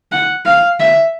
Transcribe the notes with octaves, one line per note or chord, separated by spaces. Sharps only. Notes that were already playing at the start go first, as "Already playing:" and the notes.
F#5
F5
E5